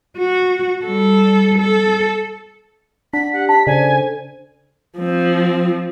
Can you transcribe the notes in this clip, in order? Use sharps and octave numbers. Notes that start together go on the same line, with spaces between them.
F#4
G3 A4
A4
D4 F#5 B6
G4 F#5
A5 B6
C#3 D4 A4 C5 D5 G#5
F3 C4